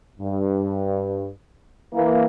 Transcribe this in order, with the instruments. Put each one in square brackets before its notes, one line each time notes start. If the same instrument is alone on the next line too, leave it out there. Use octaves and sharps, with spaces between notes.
[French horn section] G2
E3 A#3